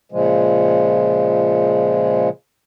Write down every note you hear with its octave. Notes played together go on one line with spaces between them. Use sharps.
A#2 C#3 F3 G#3